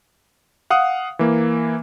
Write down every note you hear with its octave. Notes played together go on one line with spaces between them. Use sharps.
F5 F#5 D#6
E3 A#3